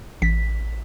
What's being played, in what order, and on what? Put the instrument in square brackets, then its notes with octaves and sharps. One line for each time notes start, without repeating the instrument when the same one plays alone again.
[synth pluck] A1 B6